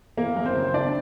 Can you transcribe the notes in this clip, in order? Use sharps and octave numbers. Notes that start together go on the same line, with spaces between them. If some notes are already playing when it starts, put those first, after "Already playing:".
E3 A#3 A#4
F#2
C4 C5
C#3
D#3 D4 D5